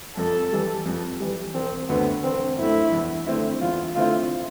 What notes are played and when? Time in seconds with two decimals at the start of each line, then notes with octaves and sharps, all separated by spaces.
0.17 F2 A4
0.52 E3 G3
0.86 F2
1.20 E3 G3
1.54 E1 C4
1.89 D2 D3 A3 B3
2.24 E1 C4
2.59 D2 D3 A3 E4
2.92 E2
3.27 D3 A3 C4 E4
3.61 E2 F4
3.95 D3 A3 C4 E4 F4